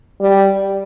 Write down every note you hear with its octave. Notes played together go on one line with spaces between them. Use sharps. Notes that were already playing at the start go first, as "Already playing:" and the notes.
G3